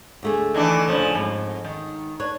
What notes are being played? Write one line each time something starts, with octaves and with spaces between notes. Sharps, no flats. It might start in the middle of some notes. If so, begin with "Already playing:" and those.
D2 A3 G#4
D#3 E3 D4
A#2 C#3 F3
F2 G#2
D#3
D4 B4 C#5